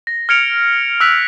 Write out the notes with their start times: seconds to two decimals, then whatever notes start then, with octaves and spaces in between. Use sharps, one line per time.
0.07 A#6
0.29 F6 G#6 C#7 D7 F7
1.00 E6 F#6 B6 F7